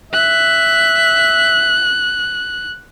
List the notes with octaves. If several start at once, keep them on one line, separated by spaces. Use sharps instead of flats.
E5 F#6